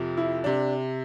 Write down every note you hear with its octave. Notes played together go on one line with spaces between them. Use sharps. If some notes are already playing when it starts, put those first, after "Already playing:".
Already playing: F2 C3 F3
E4
C3 D4